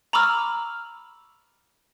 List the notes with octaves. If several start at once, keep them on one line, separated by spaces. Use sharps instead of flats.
A#5 B5 C#6 D6 E6 F6